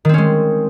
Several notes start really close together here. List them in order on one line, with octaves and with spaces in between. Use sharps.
D#3 C4 C#4 G#3